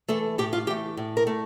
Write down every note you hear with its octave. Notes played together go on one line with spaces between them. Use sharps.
E3 A3 A4
A2 G4
F4
E3 A3 G4
A2
A#4
A3